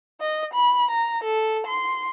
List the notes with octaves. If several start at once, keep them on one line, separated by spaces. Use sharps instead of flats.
D#5
B5
A#5
A4
C6